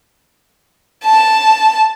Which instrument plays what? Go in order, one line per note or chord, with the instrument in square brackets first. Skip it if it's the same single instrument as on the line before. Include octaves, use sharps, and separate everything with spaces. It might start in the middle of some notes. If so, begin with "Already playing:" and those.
[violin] A5